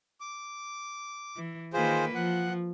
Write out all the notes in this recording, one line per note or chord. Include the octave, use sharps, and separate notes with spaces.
D6
E3
D#3 A#3 F4 G#4 B4 C5
F3 F#5